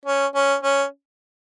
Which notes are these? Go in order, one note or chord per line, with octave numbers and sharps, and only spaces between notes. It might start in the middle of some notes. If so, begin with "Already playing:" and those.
C#4
C#4
C#4